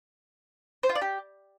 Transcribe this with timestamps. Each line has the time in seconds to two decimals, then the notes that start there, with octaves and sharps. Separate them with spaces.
0.83 C5
0.89 F4
0.95 D5
1.01 G4